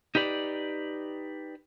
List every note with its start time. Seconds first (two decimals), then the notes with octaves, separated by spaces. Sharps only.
0.15 D#4 G4 B4 D5